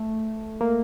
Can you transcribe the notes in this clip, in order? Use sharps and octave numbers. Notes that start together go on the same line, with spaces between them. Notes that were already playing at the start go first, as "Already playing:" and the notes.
Already playing: A3
A#3